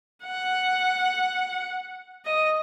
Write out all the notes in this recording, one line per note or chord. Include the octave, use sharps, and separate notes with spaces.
F#5
D#5